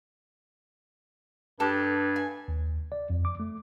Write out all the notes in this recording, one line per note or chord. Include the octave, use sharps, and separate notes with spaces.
G2 G4 A4
G#5
D#2
D5
F2
D6
A3